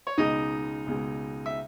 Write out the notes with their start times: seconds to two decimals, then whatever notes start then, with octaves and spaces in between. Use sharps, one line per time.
0.07 C#5
0.18 C#2 B2 G#3 D#4 D#5
0.87 C#2 B2 G#3
1.46 E5